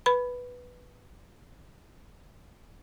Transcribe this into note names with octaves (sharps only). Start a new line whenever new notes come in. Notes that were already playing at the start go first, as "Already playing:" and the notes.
B4 B5